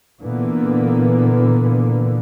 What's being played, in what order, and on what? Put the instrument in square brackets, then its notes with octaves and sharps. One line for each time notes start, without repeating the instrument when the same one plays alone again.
[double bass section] A#2 D3 E3 A#3 B3